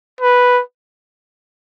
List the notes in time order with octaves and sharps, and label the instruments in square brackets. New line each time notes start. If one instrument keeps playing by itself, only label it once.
[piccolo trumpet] B4